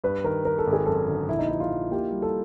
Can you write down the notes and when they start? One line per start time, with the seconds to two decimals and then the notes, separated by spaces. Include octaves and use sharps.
0.04 G2 B4
0.24 D#3 A#4
0.45 D#3 A#4
0.58 A4
0.67 G#1
0.73 G#4
0.86 F#2 A4
1.09 D3
1.28 A#1 E4
1.39 D#4
1.48 F3 E4
1.60 F4
1.70 A#1
1.91 A#3 G4
2.12 G3
2.22 A4